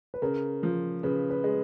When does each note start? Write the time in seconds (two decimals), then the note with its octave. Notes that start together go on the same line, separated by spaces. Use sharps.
0.14 B4
0.22 C#3 A#4
0.63 F3
1.03 C#3 B4
1.30 B4
1.44 G#3